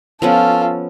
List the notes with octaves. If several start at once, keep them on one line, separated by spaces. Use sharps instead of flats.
F3 B3 C#4 F4 A4